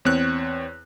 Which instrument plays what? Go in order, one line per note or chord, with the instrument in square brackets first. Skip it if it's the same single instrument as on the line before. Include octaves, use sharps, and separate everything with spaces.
[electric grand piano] E2 C4 C#5 F#6